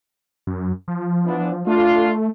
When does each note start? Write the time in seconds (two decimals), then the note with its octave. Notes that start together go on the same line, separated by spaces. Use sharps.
0.47 F#2
0.88 F3
1.26 E3 B3 D4
1.67 A3 D4 F4